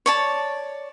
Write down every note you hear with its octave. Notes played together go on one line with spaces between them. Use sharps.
C#5 D5 A5